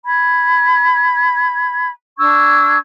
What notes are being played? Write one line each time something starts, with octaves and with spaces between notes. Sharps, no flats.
B5 G#6
D4 C#6 E6 G#6